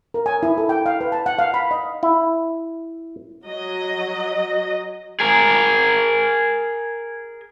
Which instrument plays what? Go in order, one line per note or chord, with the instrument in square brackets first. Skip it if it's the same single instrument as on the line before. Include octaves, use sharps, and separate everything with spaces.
[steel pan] A#4
G#5
E4
A4
G5
F5
B4
A5
F#5
F5
B5
D#5
[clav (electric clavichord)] E4
[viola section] F#3 D#5
[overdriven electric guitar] G#4 A#4